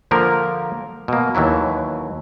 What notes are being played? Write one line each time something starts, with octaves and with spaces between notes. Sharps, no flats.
D3 F3 A#3 A#4
B2 A#3
D#2 E3 F#3 E4